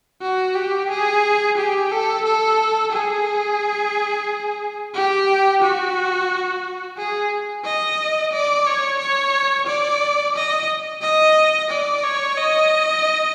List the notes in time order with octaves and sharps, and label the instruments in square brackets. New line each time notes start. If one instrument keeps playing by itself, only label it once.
[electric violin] F#4
G4
G#4
G4
A4
A4
G#4
G4
F#4
G#4
D#5
D5
C#5
C#5
D5
D#5
D#5
D5
C#5
D#5